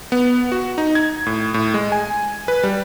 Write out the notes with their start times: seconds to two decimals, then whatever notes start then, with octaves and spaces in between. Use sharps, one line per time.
0.12 B3
0.52 F#4
0.78 D#4
0.95 G#6
1.26 A2
1.54 A2
1.74 G#3
1.92 G#5
2.48 B4
2.63 G3